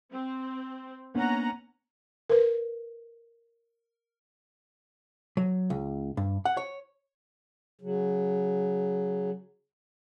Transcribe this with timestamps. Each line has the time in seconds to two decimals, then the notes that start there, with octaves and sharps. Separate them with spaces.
0.11 C4
1.15 A#3 B3 C#4 D4 F#5 A#5
2.30 A#4 B4
5.37 F#3
5.70 C#2
6.17 G2
6.45 F#5
6.57 C#5
7.81 C#3 F#3